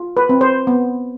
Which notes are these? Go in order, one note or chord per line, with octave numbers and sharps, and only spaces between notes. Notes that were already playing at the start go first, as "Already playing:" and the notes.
Already playing: F4
B4
C4
C5
B3